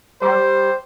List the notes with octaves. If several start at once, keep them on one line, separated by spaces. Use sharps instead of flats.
G3 C5